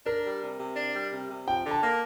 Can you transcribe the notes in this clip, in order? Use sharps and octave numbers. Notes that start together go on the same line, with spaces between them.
D4 A#4
G3
C3
C3
D4
G3
C3
C3
F3 G5
D3
A5
A#3